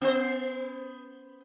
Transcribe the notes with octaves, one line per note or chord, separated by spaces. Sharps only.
B3 C5